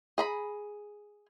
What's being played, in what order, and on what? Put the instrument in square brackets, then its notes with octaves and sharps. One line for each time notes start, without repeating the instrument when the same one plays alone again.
[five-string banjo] G#4 A#5 B5